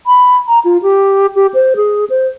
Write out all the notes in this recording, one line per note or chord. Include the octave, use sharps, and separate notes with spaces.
B5
A#5
F4
G4
G4
C5
G#4
C5